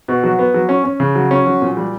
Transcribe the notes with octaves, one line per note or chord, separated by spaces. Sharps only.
B2
F#3
B3
F#3
C#4
C#4
C#3
F#3
C#4
F#3
A#2
G3